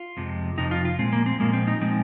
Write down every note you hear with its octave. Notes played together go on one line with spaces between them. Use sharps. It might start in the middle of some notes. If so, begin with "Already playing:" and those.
Already playing: F4
F2 C3 F3 G#3
F2 C3 F3 D#4
F4
F4
A#2 F3 G#3 C4
A#3
C4
A#2 F3 G#3 A#3
C4
D#4
A#2 F3 G#3 C4